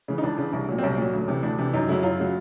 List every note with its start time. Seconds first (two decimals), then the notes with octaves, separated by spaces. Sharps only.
0.08 C#3 E3
0.18 D#4
0.23 C#2 D4
0.38 C#3 E3
0.53 C2
0.69 A#2 F#3
0.78 C4
0.83 C2 C#4
0.98 A#2 F#3
1.13 D2
1.28 C3 E3
1.43 D2 D4
1.58 C3 E3
1.73 F#2 D#4
1.88 C#3 F#3 E4
2.03 F#2 F4
2.19 C#3 F#3